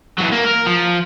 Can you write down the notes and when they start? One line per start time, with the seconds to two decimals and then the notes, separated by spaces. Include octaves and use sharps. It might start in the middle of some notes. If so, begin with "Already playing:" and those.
0.18 E3 F#3
0.32 A#3
0.44 A#4
0.66 F3